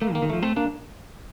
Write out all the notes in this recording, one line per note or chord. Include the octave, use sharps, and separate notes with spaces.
A3 A#3
D#3
A#3
D#3
F3 A3
A3 C4
A#3 D4